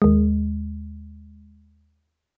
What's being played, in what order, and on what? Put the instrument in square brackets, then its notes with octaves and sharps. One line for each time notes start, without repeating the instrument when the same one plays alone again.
[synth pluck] D#2 G#3